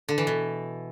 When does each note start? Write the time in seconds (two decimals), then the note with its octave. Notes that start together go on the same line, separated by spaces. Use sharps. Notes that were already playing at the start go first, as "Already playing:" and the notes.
0.09 D3
0.18 E3
0.27 B2